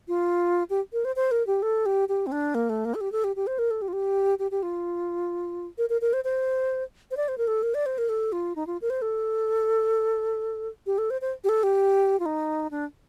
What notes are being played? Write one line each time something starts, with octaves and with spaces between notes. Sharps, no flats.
F4
G4
A#4
C5
C5
A#4
G4
A4
G4
G4
C4
D4
A#3
A3
A#3
A4
G4
A4
G4
G4
C5
A#4
A4
G4
F4
G4
G4
G4
F4
A#4
A#4
A#4
C5
C5
C5
D5
C5
A#4
A4
A#4
D5
C5
A#4
A4
F4
D#4
F4
A#4
C5
A4
G4
A4
C5
C5
G4
A4
G4
F4
D#4
D4